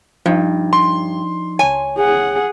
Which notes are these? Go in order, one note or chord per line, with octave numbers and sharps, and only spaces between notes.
G2 F3 D#4
C6
C#2 C#5 G#5
G#4 F#5